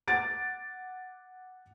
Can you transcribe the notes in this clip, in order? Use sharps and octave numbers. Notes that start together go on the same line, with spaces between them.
F#5 D6 A6 D7